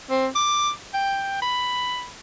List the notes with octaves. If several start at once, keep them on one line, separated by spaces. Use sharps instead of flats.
C4
D6
G5
B5